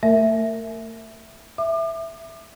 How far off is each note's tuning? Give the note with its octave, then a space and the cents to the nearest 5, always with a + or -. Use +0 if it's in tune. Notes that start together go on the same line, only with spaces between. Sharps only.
A3 +35 A#4 -30 E5 +0
E5 +0 D6 +40